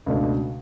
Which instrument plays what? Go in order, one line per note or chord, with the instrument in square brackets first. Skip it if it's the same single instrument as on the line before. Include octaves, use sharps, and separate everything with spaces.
[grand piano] C#2 B2 A3 D4